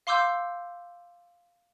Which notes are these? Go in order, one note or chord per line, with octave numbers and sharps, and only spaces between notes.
F5 C6 D6 E6 G6